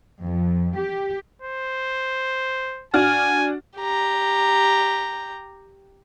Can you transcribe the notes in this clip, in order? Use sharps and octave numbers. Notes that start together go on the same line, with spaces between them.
F2
G4
C5
D4 F#4 G#5 F6
G4 A#5